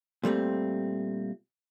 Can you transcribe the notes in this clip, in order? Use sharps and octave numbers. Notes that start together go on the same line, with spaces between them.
A#2 G3 A3 C4